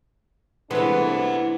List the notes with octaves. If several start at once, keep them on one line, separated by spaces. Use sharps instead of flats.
C2 E3 G#3 A3 B3 D4 C5 F#5